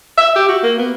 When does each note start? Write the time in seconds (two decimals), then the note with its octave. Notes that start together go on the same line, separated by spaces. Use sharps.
0.18 E5
0.35 G4
0.49 F#4
0.63 A#3
0.79 B3